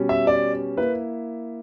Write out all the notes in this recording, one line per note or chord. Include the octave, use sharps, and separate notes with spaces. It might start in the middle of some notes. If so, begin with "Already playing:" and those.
Already playing: B2 G3 C#4
E5
D5
A#3 E4 B4